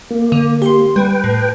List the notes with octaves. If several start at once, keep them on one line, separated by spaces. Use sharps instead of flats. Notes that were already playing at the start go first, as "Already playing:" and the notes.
A#3
D3
G4 C6
G3 B4 G5
A2